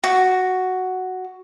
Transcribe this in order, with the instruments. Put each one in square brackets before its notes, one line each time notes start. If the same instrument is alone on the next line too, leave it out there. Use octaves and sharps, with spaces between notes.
[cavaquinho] F#4